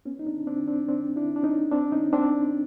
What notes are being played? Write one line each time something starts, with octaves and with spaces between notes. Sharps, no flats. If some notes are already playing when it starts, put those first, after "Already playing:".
B3 C#4
D#4
C4 D4
C4 D4
C4 D4
C4 D4
D4 E4
D4
C#4 D#4
C4 D4
C#4 D#4
C4 D4